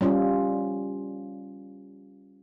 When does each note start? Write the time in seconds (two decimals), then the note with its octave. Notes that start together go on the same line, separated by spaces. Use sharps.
0.01 G3 C#4 F4